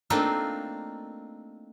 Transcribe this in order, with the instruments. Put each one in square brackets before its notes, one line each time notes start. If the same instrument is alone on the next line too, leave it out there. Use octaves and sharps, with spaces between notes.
[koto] A3 A#3 C4 D4 D#4 F4